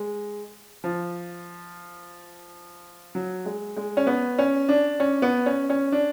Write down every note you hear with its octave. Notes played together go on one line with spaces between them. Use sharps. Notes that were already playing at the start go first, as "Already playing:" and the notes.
Already playing: G#3
F3
F#3
G#3
G#3
C#4
B3
C#4
D4
C#4
B3
C#4
C#4
D4